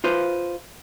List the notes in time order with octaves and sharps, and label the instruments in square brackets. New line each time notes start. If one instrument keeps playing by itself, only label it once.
[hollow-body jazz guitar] F4 B4 C5